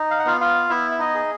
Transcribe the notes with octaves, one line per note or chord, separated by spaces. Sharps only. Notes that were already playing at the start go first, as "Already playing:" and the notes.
Already playing: D#4
F5
F#5
B3 F4 F5
F4 F5
B3 E4 E5
E5
D#4 D#5
G#4